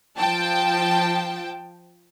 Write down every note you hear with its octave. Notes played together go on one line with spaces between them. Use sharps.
F3 G5 A5